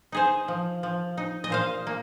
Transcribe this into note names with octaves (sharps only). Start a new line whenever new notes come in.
D#4 G#4 C5
F3
F3
D#4
D#5
A#2 C5 F5
A#3